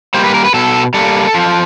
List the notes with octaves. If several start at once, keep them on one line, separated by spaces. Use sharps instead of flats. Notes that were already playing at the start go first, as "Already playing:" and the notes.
G3 A#3 C5
B4
A#4
B4
B2 A4
G3 A#3 A4
F3